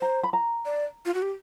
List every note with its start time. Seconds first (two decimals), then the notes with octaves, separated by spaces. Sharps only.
0.01 C5 A#5
0.23 B5
0.33 A#5
0.65 D5
1.06 F4
1.14 F#4
1.22 G4